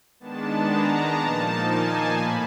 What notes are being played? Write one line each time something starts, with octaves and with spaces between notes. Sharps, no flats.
D#3 G#3 B3 D4 A5
A#5
A#2 F3 A#3 D#4 A5
G#5
A2 B5